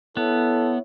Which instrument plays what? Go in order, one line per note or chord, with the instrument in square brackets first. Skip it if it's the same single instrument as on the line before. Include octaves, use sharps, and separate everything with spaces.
[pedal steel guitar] B3 [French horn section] E4 C#5 [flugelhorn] A4